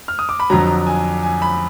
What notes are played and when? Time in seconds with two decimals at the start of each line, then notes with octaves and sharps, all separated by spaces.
0.08 F6
0.19 D#6
0.29 D6
0.40 B5
0.50 F2 D3 F#3 A#5
0.87 G#5
1.23 G#5
1.42 B5